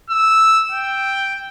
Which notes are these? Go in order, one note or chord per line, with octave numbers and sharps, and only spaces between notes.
E6
G5